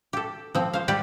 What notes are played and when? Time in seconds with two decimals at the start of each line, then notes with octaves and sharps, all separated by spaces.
0.13 G4 A4
0.55 F3 C4
0.74 C5 F5
0.88 G3 G4 D5